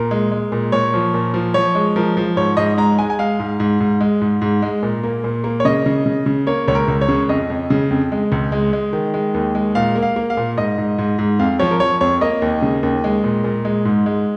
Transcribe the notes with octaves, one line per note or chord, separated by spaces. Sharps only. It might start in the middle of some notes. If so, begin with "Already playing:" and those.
Already playing: A#2 A#4
G#3
G#3
A#2
A#2 C#5
F3
A#2
F3
F3 C#5
G#3
F3 A#4
F3
G#2 C#5
G#2 D#5
G#3 A#5
G#3 G#5
G#5
G#3 F5
G#2
G#2
G#2
G#3
G#2
G#2
G#3
A#2
A#3
A#2
A#3
C#5
C#3 D#5
C#3
C#3
C#3
A#3 C#5
C#2 C#5
A#4
C#2
C#5
C#3
F2 D#5
F2
C#3
F2
G#3
C#2
G#3
G#3
D#3
G#3
D#2
G#3
A#2 F5
A#3
F5
A#3
F5
A#2
G#2 D#5
G#2
G#2
G#2
F2 F5
F3 C#5
A#4
F3 C#5
F2 C#5
A#3 D#5
D#2
C#3
D#2
G#3
A#2
A#2
G#3
G#2
G#3